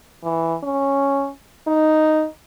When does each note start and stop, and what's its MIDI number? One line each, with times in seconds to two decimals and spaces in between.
0.24 0.55 52
0.63 1.30 61
1.67 2.25 63